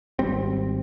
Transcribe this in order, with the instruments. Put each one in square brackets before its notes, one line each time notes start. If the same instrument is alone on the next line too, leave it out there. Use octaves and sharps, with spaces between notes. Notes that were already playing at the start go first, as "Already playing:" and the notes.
[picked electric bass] G#1 G3 C4